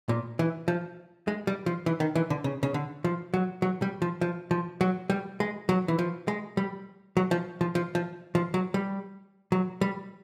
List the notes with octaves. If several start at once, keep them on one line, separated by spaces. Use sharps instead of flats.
A#2
E3
F3
G#3
G3
F3
E3
D#3
E3
D3
C#3
C#3
D3
F3
F#3
F#3
G3
F3
F3
F3
F#3
G3
G#3
F#3
E3
F3
G#3
G3
F#3
F3
F3
F3
F3
F3
F#3
G3
F#3
G3